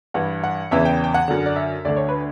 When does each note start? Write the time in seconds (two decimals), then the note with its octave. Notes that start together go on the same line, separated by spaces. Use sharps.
0.14 G2 E3 F#5
0.43 F#5
0.71 E2 C#3 E3 E5
0.85 G5
1.04 G5
1.14 F#5
1.28 F#2 D3
1.46 D5
1.56 E5
1.85 D2 D3 D5
1.96 C#5
2.08 B4